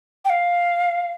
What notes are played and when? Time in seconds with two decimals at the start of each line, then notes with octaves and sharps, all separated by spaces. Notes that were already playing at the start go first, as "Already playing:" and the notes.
0.25 G5
0.30 F5